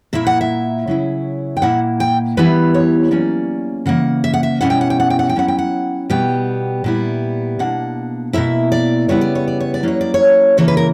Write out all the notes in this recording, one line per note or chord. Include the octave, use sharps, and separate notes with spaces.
A#2 A#3 E4 E5
F#5
E5
C#3 F#3 C#4 E4
G5
A#2 A#3 E4 F#5
G5
E3 G3 B3 E4 B4
C#5
F#3 A#3 C#4 D5
C#3 E3 A#3 F#5
E5
F#5
E5
B2 G3 C#4 E4 F#5
G5
F#5
G5
F#5
G5
F#5
G5
F#3 C#4 E4 F#5
G5
F#5
B2 G3 B3 G5
A#2 G3 B3 E4
B2 A#3 D4 F#5
B2 A#3 E4 E5
D5
C#3 G3 B3 E4 C#5
D5
C#5
D5
C#5
D5
F#3 A#3 C#4 E4 C#5
D5
C#5
C#3 E3 A#3 C#5
B4
A#4